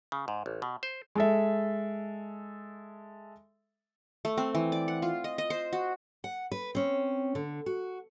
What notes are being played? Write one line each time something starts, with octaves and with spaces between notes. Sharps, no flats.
C#3
G#2
A1
B2
C5
G#3 A4 E5
A3
C4
E3
D5
F#5
F4
D#5
D#5
C5
F#4
F#5
B4
C4 C#4
D3
F#4